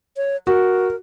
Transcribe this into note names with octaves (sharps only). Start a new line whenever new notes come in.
C#5
F#4 A#4